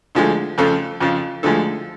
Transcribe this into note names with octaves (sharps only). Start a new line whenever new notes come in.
D2 D3 F3 G#3
F2 C#3 F3 A4
F2 C#3 F3
D2 D3 F3 G#3 A4